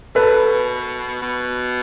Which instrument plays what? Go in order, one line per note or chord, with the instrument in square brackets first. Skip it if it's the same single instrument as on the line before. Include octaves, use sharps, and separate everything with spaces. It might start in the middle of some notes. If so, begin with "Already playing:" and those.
[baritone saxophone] B2 [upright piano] A4 B4
[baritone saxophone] B2